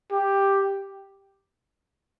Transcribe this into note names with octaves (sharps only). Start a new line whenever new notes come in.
G4